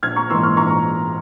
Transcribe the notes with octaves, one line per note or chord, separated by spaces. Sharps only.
A#1 F6 G#6
A#5 C#6
G#2 E3 A#3 C6 E6
C#6 F6
A#1 A#5 C#6